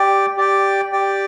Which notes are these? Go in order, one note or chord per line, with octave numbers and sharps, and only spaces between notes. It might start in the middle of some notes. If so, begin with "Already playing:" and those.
Already playing: G4 D5 G5
G4 D5 G5
G4 D5 G5